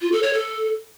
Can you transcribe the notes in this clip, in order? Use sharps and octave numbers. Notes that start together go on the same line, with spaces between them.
F4
A4
C#5
A4